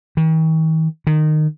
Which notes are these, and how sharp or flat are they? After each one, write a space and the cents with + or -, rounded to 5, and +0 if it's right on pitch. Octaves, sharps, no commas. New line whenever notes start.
D#3 +45
D#3 -20